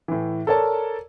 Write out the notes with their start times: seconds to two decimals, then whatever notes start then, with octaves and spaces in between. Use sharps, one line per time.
0.08 A2 E3
0.47 A4 A#4 C#5 D5 A5